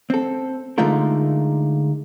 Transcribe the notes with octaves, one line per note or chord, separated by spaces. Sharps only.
C4 A4
D3 G#3 A3 D#4 F4 A#4